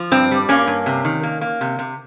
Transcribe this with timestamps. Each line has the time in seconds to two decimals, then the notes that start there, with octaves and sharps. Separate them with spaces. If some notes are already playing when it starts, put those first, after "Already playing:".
Already playing: F3
0.11 G2 C4
0.31 G3
0.49 G2 A#3 C#4
0.67 G2
0.86 C3
1.05 D#3
1.23 A#3
1.41 A#3
1.61 C3
1.79 C3